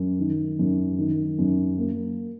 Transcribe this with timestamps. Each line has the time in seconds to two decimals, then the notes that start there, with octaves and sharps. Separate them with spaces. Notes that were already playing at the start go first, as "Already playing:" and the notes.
Already playing: F#2
0.19 D#3
0.59 F#2
0.98 D#3
1.39 F#2
1.78 A#3